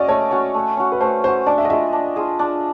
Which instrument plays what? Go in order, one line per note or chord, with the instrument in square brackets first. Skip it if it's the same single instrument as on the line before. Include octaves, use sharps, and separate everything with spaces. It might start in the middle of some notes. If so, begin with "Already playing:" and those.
Already playing: [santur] C#4 F#4 [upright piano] D5 D#5
[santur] A3 [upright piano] C#5
[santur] C#4 F#4
A3
C#4 F#4
[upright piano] B4
[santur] A3 [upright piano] C5
[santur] C#4 F#4 [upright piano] C5
[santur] D4 [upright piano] D5
[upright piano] E5
D#5
[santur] F4 G#4 [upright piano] E5
[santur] D4
F4 G#4
D4